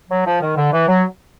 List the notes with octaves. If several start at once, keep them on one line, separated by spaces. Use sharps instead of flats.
F#3
F3
D#3
D3
E3
F#3